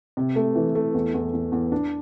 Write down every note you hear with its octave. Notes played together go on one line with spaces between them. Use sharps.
C3
A3
E3
A3
E2
E2
E2
E2
D4